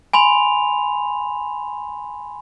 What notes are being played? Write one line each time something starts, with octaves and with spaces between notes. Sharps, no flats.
G#5 B5 C6 F7